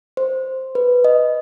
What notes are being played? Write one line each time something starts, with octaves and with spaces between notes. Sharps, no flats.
C5
B4
D#5